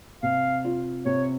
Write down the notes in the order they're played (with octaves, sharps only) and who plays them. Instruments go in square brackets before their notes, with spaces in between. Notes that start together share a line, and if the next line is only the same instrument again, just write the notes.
[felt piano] C3 [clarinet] F5
[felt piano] F4
[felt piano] C3 [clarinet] C#5